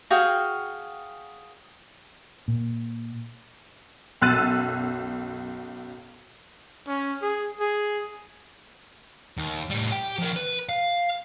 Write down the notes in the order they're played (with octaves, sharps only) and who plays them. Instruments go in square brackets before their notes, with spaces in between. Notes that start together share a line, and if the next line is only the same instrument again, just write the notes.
[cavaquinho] F#4 G#4 F5 G5
[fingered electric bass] A#2
[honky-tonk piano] B1 F#2 E6 F#6 A6 D#7
[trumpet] C#4
G#4
G#4
[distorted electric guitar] D#2
A2 G3
G4 G5
F3 A#4
B4
F5